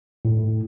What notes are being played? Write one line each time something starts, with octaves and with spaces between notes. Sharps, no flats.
A2